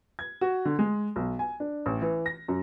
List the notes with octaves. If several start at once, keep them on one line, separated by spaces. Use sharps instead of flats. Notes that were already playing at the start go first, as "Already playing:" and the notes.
G#6
F#4
D3
G#3
B1
G#5
D4
A1
E3
A#6
F#2